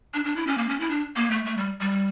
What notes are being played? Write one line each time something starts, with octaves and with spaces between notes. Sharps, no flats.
D4
D4
E4
C#4
A#3
C#4
E4
D4
A#3
A3
A3
G3
G3